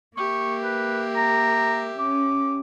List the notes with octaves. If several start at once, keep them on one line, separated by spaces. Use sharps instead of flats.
A#3 G4 E5 C#6
B4
A#5
C#4 D6